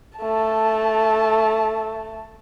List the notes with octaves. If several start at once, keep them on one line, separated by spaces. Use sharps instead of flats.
A3 A5